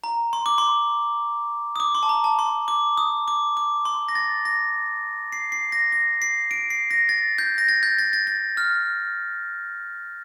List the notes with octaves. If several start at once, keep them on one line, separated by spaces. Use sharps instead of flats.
A#5
C6
D6
C6
D#6
D6
C6
A5
A#5
A5
C6
D6
D#6
D6
D6
C6
A#6
A6
A#6
C7
C7
A#6
A#6
C7
D7
C7
A#6
A6
G6
A#6
A6
G6
A6
A6
A6
F6